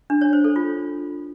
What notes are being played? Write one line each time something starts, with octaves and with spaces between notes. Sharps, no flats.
D4
C#5
C5
A4
F4